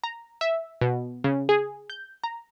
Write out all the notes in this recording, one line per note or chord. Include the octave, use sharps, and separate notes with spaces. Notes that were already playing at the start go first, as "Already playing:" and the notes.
A#5
E5
B2
C#3
G#4
G6
A#5